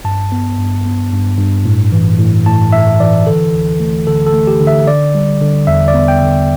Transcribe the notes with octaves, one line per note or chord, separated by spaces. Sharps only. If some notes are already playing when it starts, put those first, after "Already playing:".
G2 A5
B3
G2
B3
G2
G2
A2
E3
A2
A2 A5
A2 E5
E3 D5
D3 A4
D2
A3
D3 A4
A4
A3
G4
D3
E5
D3 D5
G3
D3
E2 E5
D5
B3
G5
D3